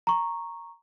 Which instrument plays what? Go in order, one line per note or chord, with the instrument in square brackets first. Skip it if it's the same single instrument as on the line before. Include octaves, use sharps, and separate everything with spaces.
[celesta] A#5 C#6